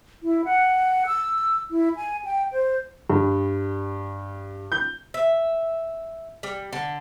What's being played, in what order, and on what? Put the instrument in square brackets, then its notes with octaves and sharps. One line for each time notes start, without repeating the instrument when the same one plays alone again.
[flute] E4
F#5
E6
E4
G#5
G5
C5
[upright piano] G2
G6
[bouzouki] E5
G3
D3